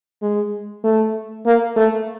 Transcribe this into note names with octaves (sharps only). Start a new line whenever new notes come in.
G#3
A3
A#3
A3